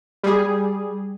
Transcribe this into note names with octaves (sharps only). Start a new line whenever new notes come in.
G3 G#4